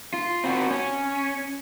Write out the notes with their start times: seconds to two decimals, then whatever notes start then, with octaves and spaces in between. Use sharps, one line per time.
0.14 F4
0.44 C4 F#4
0.71 C#4